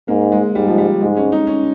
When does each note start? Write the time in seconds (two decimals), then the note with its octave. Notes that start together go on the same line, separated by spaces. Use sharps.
0.08 G#2 A#3
0.32 G#3
0.55 G#2 G3
0.67 F3
0.78 G3
1.01 G#2 G#3
1.17 C#4
1.32 D#4
1.47 C#4